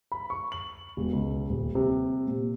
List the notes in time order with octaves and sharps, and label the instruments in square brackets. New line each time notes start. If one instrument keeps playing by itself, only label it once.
[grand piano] B5
C#6
F#7
E1
C#2
D#1
C3
A#2